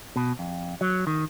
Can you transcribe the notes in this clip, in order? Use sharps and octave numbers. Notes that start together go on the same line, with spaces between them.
B2
F2
F#3
D#3